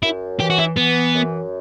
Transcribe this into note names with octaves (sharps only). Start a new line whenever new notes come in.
F#2 E4
E3 G4
F#4
E4
E3 B3
F#2